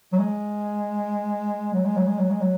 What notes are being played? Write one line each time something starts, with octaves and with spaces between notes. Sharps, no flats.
F#3
G#3
F#3
G#3
F#3
G#3
F#3
G#3
F#3